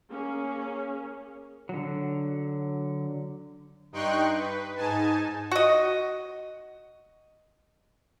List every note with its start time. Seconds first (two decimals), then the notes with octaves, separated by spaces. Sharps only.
0.11 A#3 C#4 G#4
1.69 D3 F#3
3.92 G2 D#4 G5 C6 C#6 F#6
4.37 B4
4.76 G#2 D#4 G#5 A5
5.52 F#4 D#5